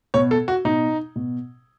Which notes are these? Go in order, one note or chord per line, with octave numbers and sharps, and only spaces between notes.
B2 C#5
A4
F#4
B2 D#4
B2